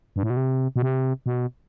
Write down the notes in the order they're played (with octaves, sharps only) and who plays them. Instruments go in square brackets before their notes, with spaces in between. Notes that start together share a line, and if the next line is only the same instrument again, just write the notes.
[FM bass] G2
A2
B2
C3
B2
C3
B2